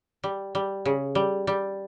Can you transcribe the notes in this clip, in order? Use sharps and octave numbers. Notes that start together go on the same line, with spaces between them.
G3
G3
C#3
G3
G3